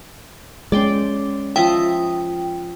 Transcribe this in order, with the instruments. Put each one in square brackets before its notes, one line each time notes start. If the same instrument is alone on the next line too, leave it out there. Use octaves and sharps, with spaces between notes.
[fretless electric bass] G#3 C#4 [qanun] D5 G5 C6
[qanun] F3 D#5 E5 [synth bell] G5